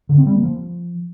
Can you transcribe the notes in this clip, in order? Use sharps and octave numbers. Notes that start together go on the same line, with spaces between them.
D3
C4
G3
A#3
F3